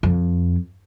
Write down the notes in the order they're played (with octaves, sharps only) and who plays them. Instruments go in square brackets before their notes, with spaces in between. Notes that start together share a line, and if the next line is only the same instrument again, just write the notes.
[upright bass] F2